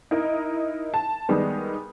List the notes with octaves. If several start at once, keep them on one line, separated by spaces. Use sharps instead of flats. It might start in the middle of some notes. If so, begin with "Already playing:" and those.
D#4 E4 A#4 D#5
A5
D#3 G3 G#3 B3